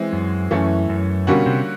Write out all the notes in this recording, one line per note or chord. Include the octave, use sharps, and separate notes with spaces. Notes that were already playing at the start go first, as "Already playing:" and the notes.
Already playing: E3 G#3 C4 E4
F#2
F#2 E3 A3 C#4 E4
F#2
B2 D3 G3 A#3 C#4 F#4
C3